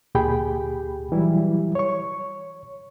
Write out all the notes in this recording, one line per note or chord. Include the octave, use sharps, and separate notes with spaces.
D2 A#2 G4 G#4 G5 B5
E3 F#3 G3 E4
C#5 C#6